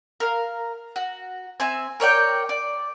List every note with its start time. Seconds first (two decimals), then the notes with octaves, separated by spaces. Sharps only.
0.20 A#4 F5
0.96 F#4
1.60 C4 E5 G#5
2.00 A#4 C#5 D5 G5
2.49 D5